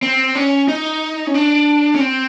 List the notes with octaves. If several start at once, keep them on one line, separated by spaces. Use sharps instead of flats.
C4
C#4
D#4
C#4
D4
C#4
C4